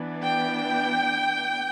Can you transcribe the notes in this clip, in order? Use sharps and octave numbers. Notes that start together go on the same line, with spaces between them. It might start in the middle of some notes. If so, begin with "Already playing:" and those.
Already playing: E3 B3 D4
G5